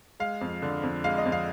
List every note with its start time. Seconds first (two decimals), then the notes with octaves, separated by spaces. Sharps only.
0.20 G#3 F5
0.41 F2
0.62 D3
0.83 F2
1.04 G#3 F5
1.18 D#5
1.25 F2
1.32 F5